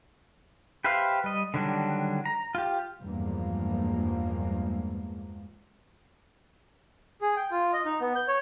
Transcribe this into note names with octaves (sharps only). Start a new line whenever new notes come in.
G4 B4 C5 E5 F5
G3 D#5
D3 D#3 F#3 G3 D4
A#5
F4 G4
E2 G2 F3 G#3 A#3
G#4
G5
F4
D#5
D#4
B3
G6
C#5